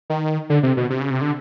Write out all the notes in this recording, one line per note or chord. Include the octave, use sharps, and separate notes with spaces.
D#3
D3
C3
B2
C3
C#3
C3
D3